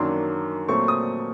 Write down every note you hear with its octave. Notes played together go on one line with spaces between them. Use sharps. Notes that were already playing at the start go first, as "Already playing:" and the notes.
Already playing: F#2 D#3 F#3 A#3 D4 C6
A#2 F#3 A3 C4 C#6
D#6